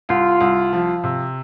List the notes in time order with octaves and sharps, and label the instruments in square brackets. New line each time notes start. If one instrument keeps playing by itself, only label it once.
[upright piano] C2 [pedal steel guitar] F4
[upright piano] C2
F3
C3